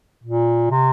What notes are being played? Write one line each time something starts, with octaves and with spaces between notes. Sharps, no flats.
A#2
C3